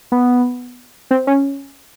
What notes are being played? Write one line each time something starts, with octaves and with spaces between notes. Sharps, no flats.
B3
C4
C#4